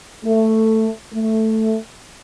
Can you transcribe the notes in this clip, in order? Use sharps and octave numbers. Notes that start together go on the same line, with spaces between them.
A3
A3